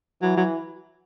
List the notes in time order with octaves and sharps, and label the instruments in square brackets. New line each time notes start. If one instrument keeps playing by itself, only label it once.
[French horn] E3 [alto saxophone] F#3
[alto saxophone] F#3